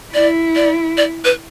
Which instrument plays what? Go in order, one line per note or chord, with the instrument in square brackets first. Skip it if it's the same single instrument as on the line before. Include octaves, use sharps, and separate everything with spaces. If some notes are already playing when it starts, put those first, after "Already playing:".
[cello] E4 [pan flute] D5
[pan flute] D5
D5
B4